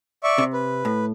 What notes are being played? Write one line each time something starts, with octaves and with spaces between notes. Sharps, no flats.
D5 E5 C#6
C3
B4
A2